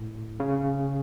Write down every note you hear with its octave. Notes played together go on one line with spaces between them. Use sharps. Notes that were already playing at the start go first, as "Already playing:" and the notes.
Already playing: A2
C#3